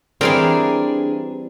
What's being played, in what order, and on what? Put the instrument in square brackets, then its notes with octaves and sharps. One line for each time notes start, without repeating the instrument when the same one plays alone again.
[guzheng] E3 G3 C4 [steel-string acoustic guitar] D4 G#4 [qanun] A#4 D5